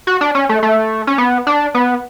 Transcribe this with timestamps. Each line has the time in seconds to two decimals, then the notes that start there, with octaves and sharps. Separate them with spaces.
0.07 F#4
0.21 D4
0.35 C#4
0.49 A3
0.63 A3
1.07 C#4
1.18 B3
1.47 D4
1.74 B3